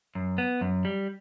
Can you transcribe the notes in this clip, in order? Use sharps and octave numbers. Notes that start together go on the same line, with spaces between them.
F#2
B3
F#2
G3